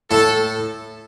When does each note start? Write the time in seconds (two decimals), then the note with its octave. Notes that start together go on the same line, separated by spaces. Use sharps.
0.10 A2 A4